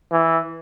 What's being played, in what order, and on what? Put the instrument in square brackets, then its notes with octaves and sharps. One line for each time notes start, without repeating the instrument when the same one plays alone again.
[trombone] E3